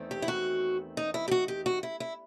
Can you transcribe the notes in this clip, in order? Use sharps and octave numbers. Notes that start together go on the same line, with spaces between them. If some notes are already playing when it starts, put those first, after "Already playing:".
Already playing: E2 D#3 A3 C4
G4
E4
F#4
D#4
E4
G4
F#4
G4
F#4
E4
E4